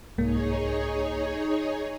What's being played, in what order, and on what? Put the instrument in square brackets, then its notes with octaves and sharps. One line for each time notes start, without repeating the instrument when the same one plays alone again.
[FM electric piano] C2 G#2 A#3 [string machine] D#4 G#4 C#5